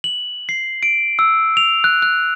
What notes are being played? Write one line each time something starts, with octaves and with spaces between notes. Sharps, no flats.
F#7
C7
D7
E6
F7
F#6
F#6